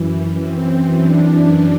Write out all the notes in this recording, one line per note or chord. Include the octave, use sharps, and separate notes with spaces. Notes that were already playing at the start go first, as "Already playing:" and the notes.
Already playing: F#2 E3
C4
D4